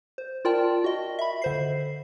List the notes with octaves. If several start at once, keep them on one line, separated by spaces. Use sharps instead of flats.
C5
F4 A#4 D5 G5 A5
F#4 D#5
E5 B5
D3 C5 C7